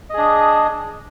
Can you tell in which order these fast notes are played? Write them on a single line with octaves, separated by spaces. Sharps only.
D#5 G#4 D4